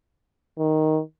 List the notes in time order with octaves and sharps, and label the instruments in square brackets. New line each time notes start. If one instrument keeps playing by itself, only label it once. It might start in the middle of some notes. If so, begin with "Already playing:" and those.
[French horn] D#3